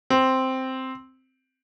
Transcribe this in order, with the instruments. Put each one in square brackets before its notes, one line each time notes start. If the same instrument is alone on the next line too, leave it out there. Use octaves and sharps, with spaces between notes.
[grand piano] C4